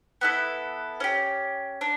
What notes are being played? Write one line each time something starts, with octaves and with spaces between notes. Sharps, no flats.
B3 E4 A4
C#4 G4
D4